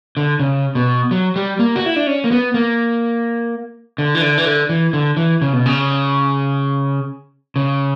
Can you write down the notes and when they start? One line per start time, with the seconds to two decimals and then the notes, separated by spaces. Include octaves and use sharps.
0.17 D3
0.40 C#3
0.75 B2
1.11 F#3
1.36 G3
1.59 A#3
1.76 F#4
1.86 E4
1.96 D4
2.07 C#4
2.24 A#3
2.31 B3
2.54 A#3
3.98 D3
4.15 E3
4.22 D3
4.38 E3
4.45 D3
4.69 E3
4.93 D3
5.17 E3
5.42 C#3
5.53 B2
5.66 C#3
7.56 C#3